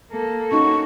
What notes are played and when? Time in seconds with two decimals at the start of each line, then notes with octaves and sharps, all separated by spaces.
0.12 A#3 A4
0.52 C#4 D#4 F#4 C#6